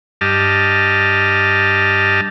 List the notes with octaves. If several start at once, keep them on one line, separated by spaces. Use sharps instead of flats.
G2 G4 D#5 A5 F6